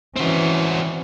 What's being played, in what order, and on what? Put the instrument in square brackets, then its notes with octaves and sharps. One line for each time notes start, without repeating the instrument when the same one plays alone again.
[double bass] E3 C#4 [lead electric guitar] C4 F#4